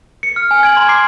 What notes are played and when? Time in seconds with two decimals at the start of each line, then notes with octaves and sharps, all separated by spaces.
0.23 C#7
0.36 F6
0.51 G#5
0.63 G#6 D7 F#7
0.77 A#5 C6
0.88 D6 C7 D7